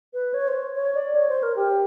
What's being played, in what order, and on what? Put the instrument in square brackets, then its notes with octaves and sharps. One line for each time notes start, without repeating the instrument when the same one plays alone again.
[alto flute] B4
C#5
C5
C#5
D5
C#5
C5
A#4
G4